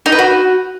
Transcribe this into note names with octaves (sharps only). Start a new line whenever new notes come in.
D#4
B4
F#4